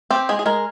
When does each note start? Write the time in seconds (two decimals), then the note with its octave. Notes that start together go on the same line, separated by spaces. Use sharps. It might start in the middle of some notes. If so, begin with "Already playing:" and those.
0.11 C4 G4
0.29 G#3 G#4
0.39 G#4
0.46 G#3 A#4